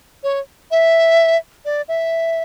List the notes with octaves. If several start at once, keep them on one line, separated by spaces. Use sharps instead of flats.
C#5
E5
D5
E5